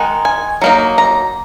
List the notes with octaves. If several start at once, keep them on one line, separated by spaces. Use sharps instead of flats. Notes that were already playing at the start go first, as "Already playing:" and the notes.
Already playing: D#3 G#3 D#4 F#5
G#5
F#3 A#3 D#4
A#5